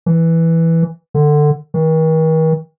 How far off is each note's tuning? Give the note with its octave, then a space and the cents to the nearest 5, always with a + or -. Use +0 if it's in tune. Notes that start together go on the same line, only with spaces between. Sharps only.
E3 +0
D3 +20
D#3 +45